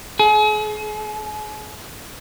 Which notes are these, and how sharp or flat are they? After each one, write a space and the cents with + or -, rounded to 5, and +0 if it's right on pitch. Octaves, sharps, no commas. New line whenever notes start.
G#4 +40